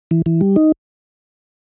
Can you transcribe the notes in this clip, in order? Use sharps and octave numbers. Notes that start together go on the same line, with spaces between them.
E3
E3
G3
D#4